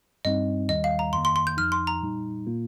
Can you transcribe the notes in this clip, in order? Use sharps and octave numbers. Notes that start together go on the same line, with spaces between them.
G2 G3 C4 D#4 D#5
D#2 D#3 G3 D#5
F5
A#5
F2 D#3 A#3 C6
C6
C6
G6
F2 F3 D#4 F6
C6
A#5
A#2 G3 D#4
A#2 A#3 F4